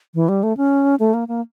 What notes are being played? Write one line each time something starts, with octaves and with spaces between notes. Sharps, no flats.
E3
G3
A3
C#4
A3
A#3
A#3